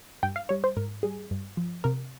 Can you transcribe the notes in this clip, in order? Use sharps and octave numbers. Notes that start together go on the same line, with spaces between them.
G2 G5
F5
G3 C#5
C5
G#2 A#4
G3 G#4
G2
F3
C3 A#4